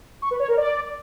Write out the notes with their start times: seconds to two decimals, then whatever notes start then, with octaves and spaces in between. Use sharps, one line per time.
0.22 C#6
0.31 B4
0.40 C#5
0.48 A#4
0.57 D5